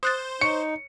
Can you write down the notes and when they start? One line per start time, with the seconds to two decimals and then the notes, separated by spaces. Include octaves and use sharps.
0.03 C5 D#6 F#6 A6
0.41 D#4 C#5 C#6 C#7